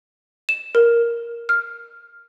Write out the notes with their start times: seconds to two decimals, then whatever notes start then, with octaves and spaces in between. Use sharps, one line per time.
0.49 E7
0.75 A#4
1.49 F6